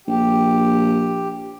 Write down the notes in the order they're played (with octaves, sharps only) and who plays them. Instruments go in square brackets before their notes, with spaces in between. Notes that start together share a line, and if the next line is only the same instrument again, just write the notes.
[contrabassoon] A#1 [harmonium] G4